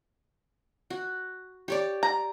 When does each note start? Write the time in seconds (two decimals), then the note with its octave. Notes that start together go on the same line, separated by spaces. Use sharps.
0.90 F#4
1.68 G4 C#5 D5
2.03 A#5